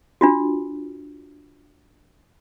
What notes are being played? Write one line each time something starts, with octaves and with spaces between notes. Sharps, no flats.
D4 F4 F#4